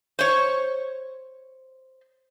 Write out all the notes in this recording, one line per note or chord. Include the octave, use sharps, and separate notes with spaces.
C5 C#5